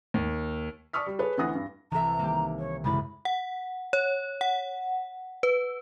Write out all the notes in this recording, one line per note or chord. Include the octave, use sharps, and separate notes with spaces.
D#2
D5 A5 C#6 D#6 F6 B6
G3
G#4 A4 B4 C#5
D2 E3 F#5 D#6 A#6
G2
C2 E3 A4 E5 A#5
D#3 G3 A#3 G4
C#5
F1 F#2 C#3 G#3 E4 B5 A6
F#5
C#5
F#5
B4